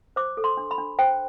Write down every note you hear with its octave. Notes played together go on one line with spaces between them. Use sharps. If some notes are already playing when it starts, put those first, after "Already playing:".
C5 D6
A4
C6
D4
B5
D4
C5 G5